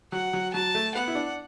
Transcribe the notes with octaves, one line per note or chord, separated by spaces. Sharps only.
F#3 F#5
F#3
F#3 A5
A3
B3 F#5
E4
D4